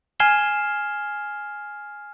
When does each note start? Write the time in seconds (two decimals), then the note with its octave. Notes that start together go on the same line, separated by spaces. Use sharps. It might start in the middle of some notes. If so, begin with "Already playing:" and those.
0.20 G#5 F6 G#6 C7 E7 G7